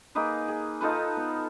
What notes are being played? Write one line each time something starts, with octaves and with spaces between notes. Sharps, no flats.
A#3 D#4 G#4 B4
G#4
D#4 F4 A4 B4
B3